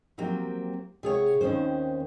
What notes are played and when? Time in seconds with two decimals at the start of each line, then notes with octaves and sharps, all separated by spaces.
0.18 F3 F#3 A#3 C4 G4
1.03 C3 G#4 C#5 F#5
1.41 D#2 D#3 C4 C#4 C5